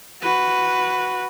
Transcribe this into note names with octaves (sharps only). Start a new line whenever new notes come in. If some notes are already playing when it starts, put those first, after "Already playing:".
F#4 B4